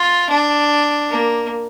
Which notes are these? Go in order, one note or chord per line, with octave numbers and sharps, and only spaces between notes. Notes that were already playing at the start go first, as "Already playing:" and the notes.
Already playing: F4
D4
A#3